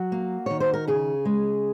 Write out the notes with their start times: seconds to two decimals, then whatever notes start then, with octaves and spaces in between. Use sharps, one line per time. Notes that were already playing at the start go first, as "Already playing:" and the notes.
Already playing: F#3 F#4
0.12 A#3
0.46 D#3 C#5
0.60 C5
0.74 A#4
0.88 C#3 G#4
1.25 G#3